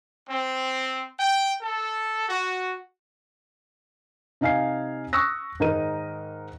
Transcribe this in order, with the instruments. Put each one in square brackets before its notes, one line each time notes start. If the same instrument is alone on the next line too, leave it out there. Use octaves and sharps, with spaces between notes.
[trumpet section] C4
G5
A4
F#4
[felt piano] C3 D#4 F5 G#5 C7
C#6 D#6 E6 F#6 A#6
G#2 D#3 D#4 A#4 D#7